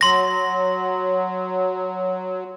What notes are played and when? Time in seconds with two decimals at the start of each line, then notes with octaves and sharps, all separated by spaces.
0.01 F#3 C6 A#6